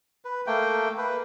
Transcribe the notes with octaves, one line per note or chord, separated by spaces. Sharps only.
B4
A3 A#3 G5
A#3 B4